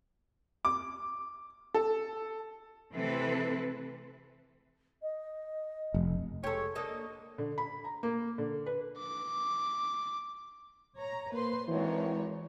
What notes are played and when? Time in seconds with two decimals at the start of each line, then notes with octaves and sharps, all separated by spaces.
0.65 D6
1.75 A4
2.94 C3 E3 A3 C4 A4 B4
5.02 D#5
5.94 F1
6.44 G#3 G4 A4 C#5
6.75 A#3 D4 A4 D#5
7.38 D3
7.58 B5
7.84 A#5
8.03 A#3
8.38 D3
8.66 B4
8.99 D6
10.98 C#5 A#5
11.33 A#3 B4 C5 C6
11.68 G#1 E3 G#3 C#5